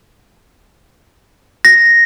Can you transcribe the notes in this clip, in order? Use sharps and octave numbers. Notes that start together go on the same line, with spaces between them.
A#6